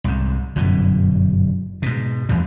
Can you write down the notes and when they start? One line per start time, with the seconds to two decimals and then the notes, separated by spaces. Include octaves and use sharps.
0.04 C2 G#2
0.56 G1 F#2 B2 E3
1.82 G#2 B2
2.29 A1 E2 F3 G3